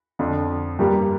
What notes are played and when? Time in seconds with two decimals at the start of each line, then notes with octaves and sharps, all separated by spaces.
0.19 F2 D3 F3 D4
0.79 G2 G3 A#3 G4